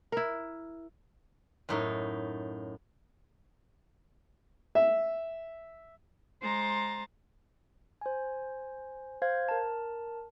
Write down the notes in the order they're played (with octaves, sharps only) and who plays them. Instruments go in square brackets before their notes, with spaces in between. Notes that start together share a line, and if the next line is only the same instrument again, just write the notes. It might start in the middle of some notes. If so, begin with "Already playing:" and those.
[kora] E4 A#4
[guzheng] F#2 A2 D#4
[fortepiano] E5
[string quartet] G#3 C5 A#5 C6 A6
[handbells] C5 G#5
C5 F5 G#6
A#4 A5